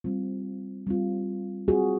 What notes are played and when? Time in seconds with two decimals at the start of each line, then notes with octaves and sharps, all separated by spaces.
0.04 G3 C4 F4
0.87 G3 C4 F4
1.68 G3 C4 F4 F#4 G#4